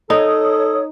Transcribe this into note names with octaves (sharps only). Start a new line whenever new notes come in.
D#4 A4 C#5 D#6